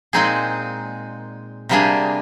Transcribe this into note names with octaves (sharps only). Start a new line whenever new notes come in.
A#2 G#3 C4 D#4 G#4
C3 G3 A#3 D4 G#4